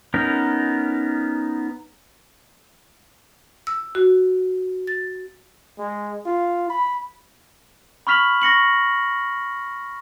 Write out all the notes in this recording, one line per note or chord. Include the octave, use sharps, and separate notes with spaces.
B3 C#4 D#4 A#4
E6
F#4
A6
G#3
F4
B5
B5 C#6 F6 B6 F7 F#7
C#6 A#6 C#7 F#7